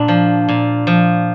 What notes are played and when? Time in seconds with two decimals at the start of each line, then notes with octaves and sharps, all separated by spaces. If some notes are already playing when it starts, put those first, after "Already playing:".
Already playing: A#2 D4
0.08 F3
0.49 A#2
0.87 F3